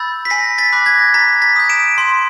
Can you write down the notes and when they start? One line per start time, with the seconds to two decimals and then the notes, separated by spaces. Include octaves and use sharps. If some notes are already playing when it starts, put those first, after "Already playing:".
Already playing: B5 E6 G6 A6
0.25 B6
0.30 G#5 A#6 C7
0.58 A6 B6
0.72 B5 D6 F#6
0.86 G#6 A#6
1.14 A#5 A6 B6
1.42 A6 B6
1.56 D#6 G6
1.69 D7 E7
1.98 C6